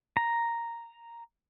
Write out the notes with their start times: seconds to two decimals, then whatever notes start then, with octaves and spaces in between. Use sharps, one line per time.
0.17 A#5